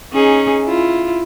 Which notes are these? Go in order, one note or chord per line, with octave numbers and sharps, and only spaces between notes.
C#4 D#4 G#4
E4 F4